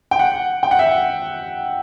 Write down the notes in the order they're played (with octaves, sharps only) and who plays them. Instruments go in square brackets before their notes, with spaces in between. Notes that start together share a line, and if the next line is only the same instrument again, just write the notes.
[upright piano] G5
F#5
G5
F#5
E5